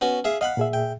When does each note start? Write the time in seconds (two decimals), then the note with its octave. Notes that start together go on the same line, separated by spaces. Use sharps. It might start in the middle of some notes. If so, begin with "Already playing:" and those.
0.01 B3 C#4 F#4
0.24 G#4 E5 F5
0.41 D#5 F5 F#5 B5 F#6
0.57 A#2 G#4 E5
0.73 G5